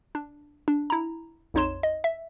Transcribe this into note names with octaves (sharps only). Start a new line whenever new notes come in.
D4
D4
E4 A#5
A#1 F2 D#4 C#5 C6 E7
D#5
E5